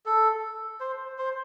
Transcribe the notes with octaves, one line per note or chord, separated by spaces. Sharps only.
A4
C5
C5